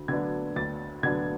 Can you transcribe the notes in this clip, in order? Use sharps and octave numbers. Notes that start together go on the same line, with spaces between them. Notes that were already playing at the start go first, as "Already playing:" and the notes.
Already playing: D2
D3 F#3 B3 D4 G#6
D2 A6
D3 F#3 B3 D4 G#6